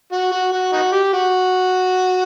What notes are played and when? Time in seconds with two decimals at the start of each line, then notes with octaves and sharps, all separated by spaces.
0.12 F#4
0.32 F#4
0.52 F#4
0.73 D#4 F#4
0.92 G4
1.13 F#4